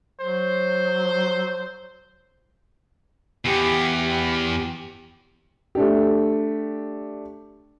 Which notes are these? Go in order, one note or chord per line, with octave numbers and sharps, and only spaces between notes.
F#3 C5
E2 G4
G4
A3 D4 G4